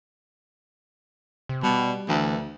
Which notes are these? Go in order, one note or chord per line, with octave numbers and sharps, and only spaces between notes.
C3
B2 G3
D2 E3